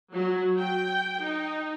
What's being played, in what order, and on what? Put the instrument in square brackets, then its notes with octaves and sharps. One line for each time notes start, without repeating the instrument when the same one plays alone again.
[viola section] F#3
G5
D#4